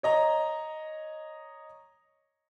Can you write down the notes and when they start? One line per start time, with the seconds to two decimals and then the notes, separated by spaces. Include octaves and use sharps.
0.03 C#5 D#5 A#5